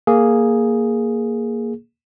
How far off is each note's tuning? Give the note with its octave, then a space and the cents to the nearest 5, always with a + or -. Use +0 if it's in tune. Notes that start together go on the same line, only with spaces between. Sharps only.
A#3 +0 G#4 +0